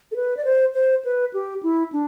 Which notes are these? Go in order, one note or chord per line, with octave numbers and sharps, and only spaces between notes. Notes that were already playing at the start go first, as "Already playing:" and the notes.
A4
B4
D5
C5
C5
B4
G4
E4
D4